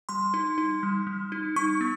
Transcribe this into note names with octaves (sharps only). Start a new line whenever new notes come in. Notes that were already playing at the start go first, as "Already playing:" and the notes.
G3 C6
D#4
D#4
G3
G3
D#4
D#4 C#6
B3